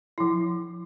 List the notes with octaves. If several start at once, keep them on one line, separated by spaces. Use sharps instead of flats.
F3 E4